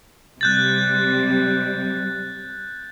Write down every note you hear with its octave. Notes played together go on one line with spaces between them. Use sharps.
C3 G3 F#6 G6 A6